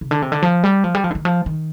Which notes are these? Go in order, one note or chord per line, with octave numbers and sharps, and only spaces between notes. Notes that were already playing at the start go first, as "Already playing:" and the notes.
C3
D3
C3
D3
F3
G3
F3
G3
F3
D3
D#3
F3
D#3